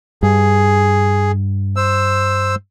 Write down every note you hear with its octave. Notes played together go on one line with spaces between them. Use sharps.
G2 G#4
C5 E6